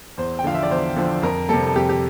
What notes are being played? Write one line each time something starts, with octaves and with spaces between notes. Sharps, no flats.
E2 C5
G5
D3 F3 F5
E5
D5
E2 C5
D3 F3
F2 A#4
C3 G3 A4
A4
F2 G4
G4